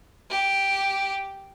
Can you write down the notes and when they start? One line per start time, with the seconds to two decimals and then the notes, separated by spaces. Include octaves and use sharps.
0.30 G4